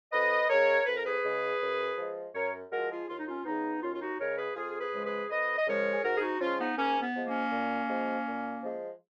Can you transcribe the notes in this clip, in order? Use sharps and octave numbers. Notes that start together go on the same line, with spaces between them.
F2 B4 D#5
C#3 G#3 A#4 C#5
F2 B4
A#4
G#4 B4
C#3 G#3
F#2
F3 G#3
F#2 A#4 C#5
F3 G#3 F#4 A#4
F4 G#4
D#2 F4
D#4
C#4 F4
C#3 G#3 B3 D#4
D#2 C#4 F4
F4
D#4 F#4
C#3 G#3 A#4 C#5
G#4 B4
F2 F4 G#4
G#4 B4
C#3 F3 G#3
G#4 B4
F2 B4 D#5
D#5
C#3 F3 G#3 A#4 C#5
G#4
G#2 F#4 A#4
G#4
D#4 F#4
F3 G#3 C#4 F4
B3 D#4
G#2 A#3 C#4
B3
F3 G#3
A#3 C#4
A#2
F3 G#3
A#2
F3 G#3